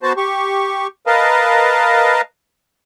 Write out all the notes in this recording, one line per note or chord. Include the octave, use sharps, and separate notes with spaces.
B3 F#4 C5 A5
G4 C#6
A#4 B4 D#5 F5 A5